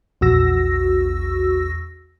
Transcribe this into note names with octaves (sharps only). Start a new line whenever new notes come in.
A#1 E2 F#4 E6 A#6